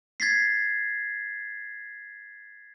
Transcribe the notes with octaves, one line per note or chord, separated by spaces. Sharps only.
G#6 A6 B6 C7